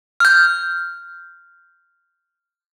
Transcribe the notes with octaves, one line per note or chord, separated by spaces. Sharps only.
F6 G6